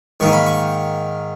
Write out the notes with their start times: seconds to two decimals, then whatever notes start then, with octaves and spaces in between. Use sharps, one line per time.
0.20 G#2 D#3 A#3 C#6
0.33 B5
0.46 C#6